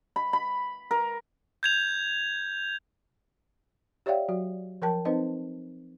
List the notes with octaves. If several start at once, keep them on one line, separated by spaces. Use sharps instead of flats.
B5
B5
A#4
G6 G#6 F7
G4 C#5 D5 E5 F5 G5
F#3 F#4
F3 A#4 G5 A5
C4 D#4 B4 C5 D#5